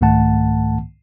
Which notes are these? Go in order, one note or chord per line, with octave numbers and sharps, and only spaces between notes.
C2 G#2 D#3 A3 F#5 A5